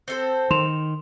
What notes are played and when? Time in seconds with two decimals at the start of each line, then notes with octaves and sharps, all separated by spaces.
0.08 C4 A4 C5
0.51 D#3 C6 E7 F7